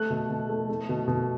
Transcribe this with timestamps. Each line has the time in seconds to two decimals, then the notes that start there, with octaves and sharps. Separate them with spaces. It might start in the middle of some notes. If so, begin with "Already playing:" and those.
Already playing: A3 F#6
0.10 B2
0.30 B2
0.49 A3
0.69 A3
0.89 B2
1.08 B2